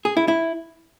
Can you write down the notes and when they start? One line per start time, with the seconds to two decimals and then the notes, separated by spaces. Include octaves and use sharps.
0.05 G#4
0.17 E4
0.28 E4